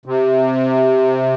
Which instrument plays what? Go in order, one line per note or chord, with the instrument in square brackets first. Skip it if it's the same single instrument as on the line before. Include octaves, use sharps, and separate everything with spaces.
[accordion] C3